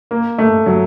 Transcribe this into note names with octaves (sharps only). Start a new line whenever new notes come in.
A#3
A3
F#3